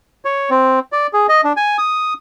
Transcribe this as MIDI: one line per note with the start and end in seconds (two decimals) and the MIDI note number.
0.25 0.50 73
0.50 0.79 60
0.92 1.07 74
1.13 1.27 68
1.29 1.41 75
1.44 1.53 62
1.57 1.77 80
1.78 2.14 87